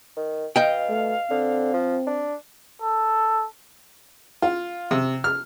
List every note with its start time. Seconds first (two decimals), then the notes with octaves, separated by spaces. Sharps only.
0.17 D#3
0.56 B2 D#5 F5 G5
0.89 A3
1.31 D3 C4
1.74 F3
2.07 D4
2.82 A4
4.42 F4
4.91 C3
5.24 F6